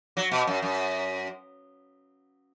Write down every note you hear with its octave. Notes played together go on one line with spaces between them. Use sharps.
F#3
B2
F#2
F#2